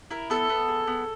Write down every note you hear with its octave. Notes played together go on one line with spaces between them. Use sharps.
E4 A#4
B3 A4
B3
G#4
B3